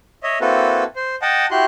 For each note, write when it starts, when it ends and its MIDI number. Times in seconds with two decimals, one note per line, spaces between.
0.23 0.38 73
0.23 0.38 75
0.23 0.38 76
0.41 0.84 58
0.41 0.84 60
0.41 0.84 64
0.41 0.84 66
0.41 0.84 69
0.41 0.84 71
0.96 1.15 72
1.22 1.46 75
1.22 1.46 78
1.22 1.46 79
1.22 1.46 81
1.51 1.66 64
1.51 1.66 66
1.51 1.66 67
1.51 1.66 84
1.51 1.66 90